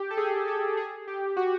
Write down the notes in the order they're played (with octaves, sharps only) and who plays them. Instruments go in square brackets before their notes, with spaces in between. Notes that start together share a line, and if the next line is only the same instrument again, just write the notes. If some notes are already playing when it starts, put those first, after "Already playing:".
Already playing: [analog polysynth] G4
A4
G#4
A4
G#4
G4
F#4